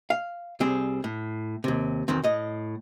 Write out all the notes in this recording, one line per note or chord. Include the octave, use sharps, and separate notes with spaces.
F5
C2 G3 C4 G#4
A2
D#2 C3
B1 E2 D#3 C4
A2 D#5